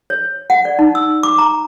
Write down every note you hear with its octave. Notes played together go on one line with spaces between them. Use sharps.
C#5
F#5
D5
D#4
E6
D6
A#5